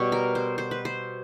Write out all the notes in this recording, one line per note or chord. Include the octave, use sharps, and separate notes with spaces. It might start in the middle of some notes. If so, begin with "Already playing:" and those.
Already playing: B2 G3 B3 C#5
A#4
C5
C5
B4
C5